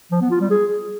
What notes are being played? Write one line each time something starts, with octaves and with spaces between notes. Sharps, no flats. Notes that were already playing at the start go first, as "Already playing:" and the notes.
F3
B3
F4
G3
G#4